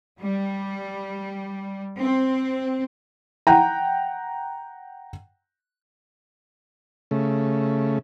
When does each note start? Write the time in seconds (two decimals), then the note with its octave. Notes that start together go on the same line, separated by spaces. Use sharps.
0.19 G3
1.99 C4
3.47 F#5 G5 A#5
7.11 C#3 A3